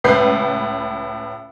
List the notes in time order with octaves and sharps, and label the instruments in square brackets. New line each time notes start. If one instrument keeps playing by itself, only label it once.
[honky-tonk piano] C#2 A2 B4 G6 C7